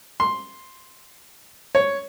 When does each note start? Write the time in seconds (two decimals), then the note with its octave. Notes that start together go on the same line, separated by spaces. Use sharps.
0.20 C6
1.75 C#5